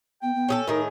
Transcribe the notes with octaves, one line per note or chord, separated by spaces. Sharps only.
B3 G5
B3
C#4 G#4 A4
A2 D#3 D#4 G#4 A#4